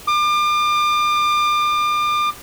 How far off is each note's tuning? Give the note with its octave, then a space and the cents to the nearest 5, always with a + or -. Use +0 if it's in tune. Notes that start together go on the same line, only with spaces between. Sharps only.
D6 +35